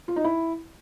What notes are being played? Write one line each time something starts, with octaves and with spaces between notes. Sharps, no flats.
F4
D#4
E4